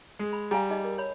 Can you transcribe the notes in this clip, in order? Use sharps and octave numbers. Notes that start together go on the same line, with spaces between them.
G#3
B5
G3 F5 G#5 A#5
D#4 G#4 D#5
A#4
C#5 B5